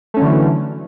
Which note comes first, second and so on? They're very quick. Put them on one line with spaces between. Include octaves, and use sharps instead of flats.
A3 C#4 F#3 D3 E3